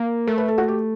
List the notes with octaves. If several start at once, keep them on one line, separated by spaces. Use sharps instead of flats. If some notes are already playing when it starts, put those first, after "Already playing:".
Already playing: A#3
A3 A#4
B4
A4
F#4
G4